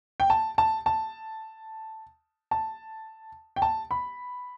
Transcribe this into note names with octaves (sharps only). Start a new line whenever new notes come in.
G5
A5
A5
A5
A5
G5
A5
B5